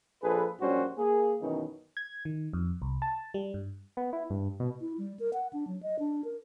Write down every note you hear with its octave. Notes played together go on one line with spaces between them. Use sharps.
A#1 F3 G#4 A4 B4
A#1 F#2 G3 C#4 F#4 C5
A#3 G#4
F#2 B2 D#3 E3 C#4 D#4
G#6
D#3
F2
C2
A5
G3
G2
B3
E4
G2
B2
E4
G3
A#4
F#5
D4
F#3
D#5
D4
A#4